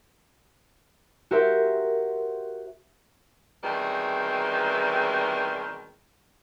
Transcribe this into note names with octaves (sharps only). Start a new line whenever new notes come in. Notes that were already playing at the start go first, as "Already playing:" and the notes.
F#4 G4 A#4 C5 E5
B2 D#3 E3 G3 G#3 C4